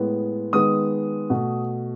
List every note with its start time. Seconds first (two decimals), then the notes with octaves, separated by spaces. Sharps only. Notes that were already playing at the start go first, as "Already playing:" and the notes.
Already playing: A2 G#3 B3
0.53 D#3 G#3 B3 D#6
1.30 B2 A3